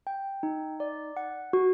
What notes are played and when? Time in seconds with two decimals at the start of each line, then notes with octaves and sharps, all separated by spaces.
0.07 G5
0.43 D#4
0.80 D5
1.17 F#5
1.53 F#4